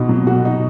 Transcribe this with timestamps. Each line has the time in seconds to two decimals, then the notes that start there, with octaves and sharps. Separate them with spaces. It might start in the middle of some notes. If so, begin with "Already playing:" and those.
Already playing: B2 D#4
0.09 F#3
0.27 F#4
0.45 D#4